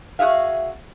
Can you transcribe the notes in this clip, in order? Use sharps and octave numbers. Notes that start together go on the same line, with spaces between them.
F#4 G#4 E5 F5